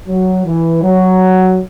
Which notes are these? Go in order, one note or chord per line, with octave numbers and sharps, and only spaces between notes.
F#3
E3
F#3